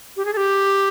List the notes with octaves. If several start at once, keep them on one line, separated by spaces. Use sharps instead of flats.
G4
G#4
A4
G4